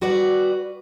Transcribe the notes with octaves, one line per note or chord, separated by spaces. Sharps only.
G3 F#4 B4 D5